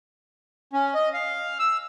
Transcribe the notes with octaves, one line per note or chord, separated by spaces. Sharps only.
C#4
D#5
F5
E6